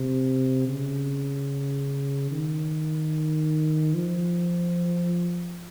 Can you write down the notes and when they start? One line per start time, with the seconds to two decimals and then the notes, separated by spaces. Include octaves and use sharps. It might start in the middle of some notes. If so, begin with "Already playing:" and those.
Already playing: C3
0.68 C#3
2.31 D#3
3.94 F3